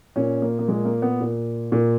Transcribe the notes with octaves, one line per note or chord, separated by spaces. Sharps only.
A#2 C#4
A#3
A#3
A#2 G#3
A#3
B3
A#2
A#2